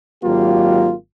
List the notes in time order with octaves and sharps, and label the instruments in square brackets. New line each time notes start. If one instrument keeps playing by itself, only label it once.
[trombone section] G#1 F#3 A#3 F4 G4